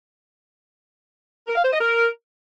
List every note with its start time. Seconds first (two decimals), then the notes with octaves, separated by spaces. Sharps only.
1.48 A#4
1.56 F5
1.64 C5
1.72 D#5
1.80 A#4